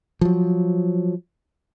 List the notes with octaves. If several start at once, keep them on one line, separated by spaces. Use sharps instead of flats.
F3 F#3